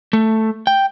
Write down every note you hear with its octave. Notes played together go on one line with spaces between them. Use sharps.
A3
G5